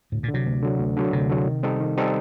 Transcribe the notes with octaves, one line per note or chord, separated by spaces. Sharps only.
D2 A2
A#2
D3
C3 F#3
D2
D3 F#3
D2
D3 F#3
D2 C3
D3 F#3
D#3
G3 C4 D#4 A4
D#3
G3 C4 D#4 A4